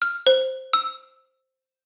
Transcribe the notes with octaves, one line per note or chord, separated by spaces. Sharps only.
F6
C5
E6